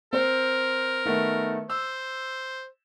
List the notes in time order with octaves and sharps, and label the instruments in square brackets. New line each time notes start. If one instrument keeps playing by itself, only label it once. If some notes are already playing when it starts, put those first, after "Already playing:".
[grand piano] C4 C5 [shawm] A#4
[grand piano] D#3 A3 B3
[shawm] C5 [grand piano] E6